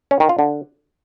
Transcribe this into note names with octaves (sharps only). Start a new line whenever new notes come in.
C#4
D#3
F4
D3